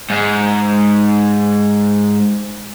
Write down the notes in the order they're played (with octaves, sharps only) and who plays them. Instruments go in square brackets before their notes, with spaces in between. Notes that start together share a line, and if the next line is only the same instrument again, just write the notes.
[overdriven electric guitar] G#2 G#3